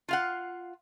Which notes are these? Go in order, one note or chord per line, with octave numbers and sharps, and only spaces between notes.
F4 F5 F#5